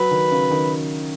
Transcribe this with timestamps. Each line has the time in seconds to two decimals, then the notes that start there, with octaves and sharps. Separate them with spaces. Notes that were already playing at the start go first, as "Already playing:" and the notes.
Already playing: F#3 B4
0.11 D#3
0.31 C#3
0.51 D#3